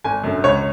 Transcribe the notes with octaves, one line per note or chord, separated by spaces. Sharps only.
G#1 G#5
F#2 D3
C#2 C#5